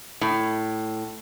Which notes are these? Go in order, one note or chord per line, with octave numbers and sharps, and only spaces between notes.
A2